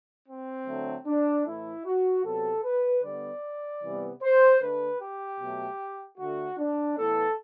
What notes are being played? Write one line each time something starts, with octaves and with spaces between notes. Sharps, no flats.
C4
D3 F#3 A3
D4
A2 E3 A3 E4
F#4
C3 F#3 B3 A4
B4
D3 G3 B3 D5
C3 E3 G3 B3
C5
D3 A3 B4
G4
B2 F#3 A3
D3 A3 F#4
D4
A2 E3 B3 A4